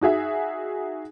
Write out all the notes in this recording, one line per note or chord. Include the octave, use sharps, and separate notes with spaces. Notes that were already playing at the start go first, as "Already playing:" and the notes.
D#4 F#4 G#4 E5